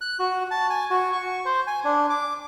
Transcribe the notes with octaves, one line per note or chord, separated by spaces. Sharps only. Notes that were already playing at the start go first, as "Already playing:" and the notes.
F#6
F#4
A5
G#5
F#4
C#6
C5
G#5
D4
D6